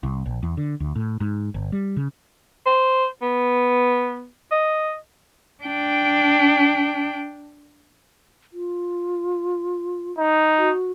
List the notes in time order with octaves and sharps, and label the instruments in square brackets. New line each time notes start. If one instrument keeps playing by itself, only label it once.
[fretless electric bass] C2
A#1
E2
D3
D2
A2
G#2
G1
G3
C#3
[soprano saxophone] C5
B3
D#5
[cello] D4 G5
[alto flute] F4
[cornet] D#4
[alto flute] F#4